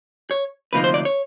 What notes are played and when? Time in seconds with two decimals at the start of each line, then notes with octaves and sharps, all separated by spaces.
0.31 C#5
0.73 D2 C3 F3 A#3 D#4 B4
0.84 C5
0.94 D5
1.05 C#5